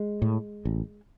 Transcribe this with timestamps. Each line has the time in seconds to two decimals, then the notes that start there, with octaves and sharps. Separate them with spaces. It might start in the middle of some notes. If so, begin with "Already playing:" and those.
Already playing: G#3
0.22 A2
0.65 A1